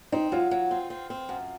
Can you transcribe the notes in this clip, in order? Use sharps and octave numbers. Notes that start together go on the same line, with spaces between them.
C4 D#4
F#3 F4
F#3
C4
C4
C4
F#2